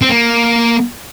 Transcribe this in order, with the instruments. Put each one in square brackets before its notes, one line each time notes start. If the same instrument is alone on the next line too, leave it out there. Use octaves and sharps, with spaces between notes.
[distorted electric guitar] C4
A#3